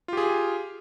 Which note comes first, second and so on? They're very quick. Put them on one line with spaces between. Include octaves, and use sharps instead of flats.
F4 G4 G#4